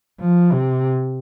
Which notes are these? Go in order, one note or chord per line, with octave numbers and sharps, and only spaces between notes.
F3
C3